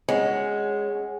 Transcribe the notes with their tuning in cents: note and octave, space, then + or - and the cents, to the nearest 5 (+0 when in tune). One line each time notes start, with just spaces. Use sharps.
G#3 +0 C#4 +5 F#4 +10